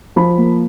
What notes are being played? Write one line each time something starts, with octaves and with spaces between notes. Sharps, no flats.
F3 B5
A#3